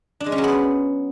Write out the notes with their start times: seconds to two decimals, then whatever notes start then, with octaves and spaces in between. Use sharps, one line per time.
0.20 D4
0.26 G#3
0.32 C#4
0.38 F#3
0.44 B3